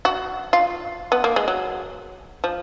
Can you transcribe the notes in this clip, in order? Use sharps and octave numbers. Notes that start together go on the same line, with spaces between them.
F#4
F4
B3
A#3
G#3
F#3
F3